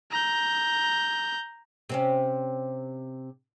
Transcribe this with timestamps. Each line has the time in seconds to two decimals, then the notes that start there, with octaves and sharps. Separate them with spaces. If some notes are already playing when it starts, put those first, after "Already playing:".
0.11 A#5 G6
1.89 C3 C4 C#4